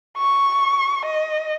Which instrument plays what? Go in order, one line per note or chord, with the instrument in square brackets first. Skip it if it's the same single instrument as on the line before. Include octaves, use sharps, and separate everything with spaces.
[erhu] C#6
D#5